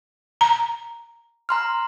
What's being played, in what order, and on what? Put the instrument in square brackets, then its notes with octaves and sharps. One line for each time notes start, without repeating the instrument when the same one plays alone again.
[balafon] A#5
[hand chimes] A#5 C6 F6